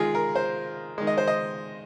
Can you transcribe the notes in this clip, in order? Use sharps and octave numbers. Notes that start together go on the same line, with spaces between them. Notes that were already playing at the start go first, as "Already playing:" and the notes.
Already playing: D#3 G#3 F4 G#4
A#4
C5
D#3 G#3
D#5
C5
D#5